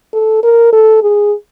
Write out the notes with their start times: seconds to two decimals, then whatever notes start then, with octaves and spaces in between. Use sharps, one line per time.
0.13 A4
0.43 A#4
0.73 A4
1.02 G#4